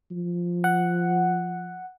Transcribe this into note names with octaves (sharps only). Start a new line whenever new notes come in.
F3
F#5